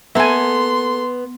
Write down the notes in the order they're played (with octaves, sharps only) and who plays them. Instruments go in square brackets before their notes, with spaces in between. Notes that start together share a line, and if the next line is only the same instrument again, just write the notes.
[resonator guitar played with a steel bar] A#3 A4 [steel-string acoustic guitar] B3 [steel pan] E5 G#5 [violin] C6